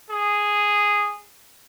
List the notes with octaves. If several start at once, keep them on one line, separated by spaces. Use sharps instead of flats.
G#4